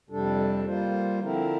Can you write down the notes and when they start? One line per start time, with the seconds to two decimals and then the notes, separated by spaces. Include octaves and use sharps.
0.09 F2 C3 G3 D4 A4
0.65 G3 A#3 F4 C5
1.20 D3 F3 C4 E4 A#4